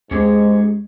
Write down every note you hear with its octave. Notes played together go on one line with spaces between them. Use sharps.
D#2 G#2 G#3 C4 C#4 G4 G#4